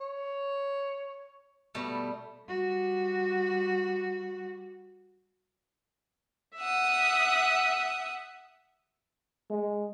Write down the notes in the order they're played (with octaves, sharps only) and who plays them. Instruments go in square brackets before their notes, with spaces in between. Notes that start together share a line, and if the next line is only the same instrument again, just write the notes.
[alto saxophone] C#5
[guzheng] B2 G3 A3
[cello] G3 F#4
[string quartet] E5 F#5 D#6
[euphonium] G#3